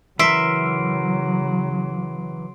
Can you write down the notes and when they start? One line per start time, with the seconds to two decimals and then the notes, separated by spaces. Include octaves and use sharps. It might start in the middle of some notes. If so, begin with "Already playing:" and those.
0.19 C#3 E3 F#3 A#4 E5 C6 C7 D7